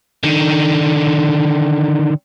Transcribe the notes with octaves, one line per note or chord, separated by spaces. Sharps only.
D3 D#3